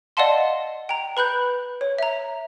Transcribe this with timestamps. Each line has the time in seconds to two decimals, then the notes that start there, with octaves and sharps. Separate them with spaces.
0.17 D5 D#5 F5 F#5 A5 C6
0.89 G5 A#5
1.17 B4 B5 F#6 G6
1.81 C#5
1.98 E5 A#5